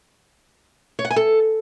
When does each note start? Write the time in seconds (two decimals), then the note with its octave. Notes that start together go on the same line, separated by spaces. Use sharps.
0.99 C#5
1.05 F#5
1.11 G#5
1.16 A4